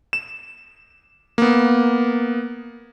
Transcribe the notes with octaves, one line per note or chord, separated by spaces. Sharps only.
E7
A#3 B3